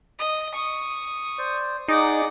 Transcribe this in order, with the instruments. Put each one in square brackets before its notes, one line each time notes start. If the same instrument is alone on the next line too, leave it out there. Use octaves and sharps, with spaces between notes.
[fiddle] D#5
C#6 D#6
[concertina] C5 D5
[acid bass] D#4 [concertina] G#4 D5 D#5 [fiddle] F#5 D6